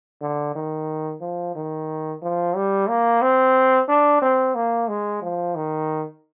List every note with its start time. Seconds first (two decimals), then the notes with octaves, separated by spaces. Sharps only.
0.22 D3
0.55 D#3
1.21 F3
1.56 D#3
2.22 F3
2.55 G3
2.88 A#3
3.22 C4
3.89 D4
4.22 C4
4.55 A#3
4.88 G#3
5.22 F3
5.56 D#3